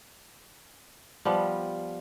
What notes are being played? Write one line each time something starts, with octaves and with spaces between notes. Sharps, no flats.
F3 G3 B3